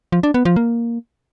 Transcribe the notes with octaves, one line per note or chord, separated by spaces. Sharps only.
F3
D4
B3
F3
A#3